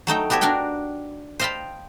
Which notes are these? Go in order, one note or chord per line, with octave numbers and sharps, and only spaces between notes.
F#3 A3 D#4 G5
B3 F#4 G4 A4 C#5
D4 F#4 A#4 F#5 G5
C5 D#5 F5 G5 A5 B5